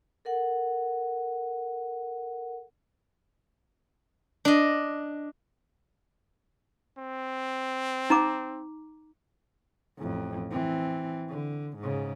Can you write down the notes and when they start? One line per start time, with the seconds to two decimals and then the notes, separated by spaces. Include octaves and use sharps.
0.25 A4 A#4 F#5
4.45 D4 D#5
6.98 C4
8.10 D#4 A#5 D6
9.98 A1 F2
10.51 E3 C4
11.29 D3
11.79 G#2 C#3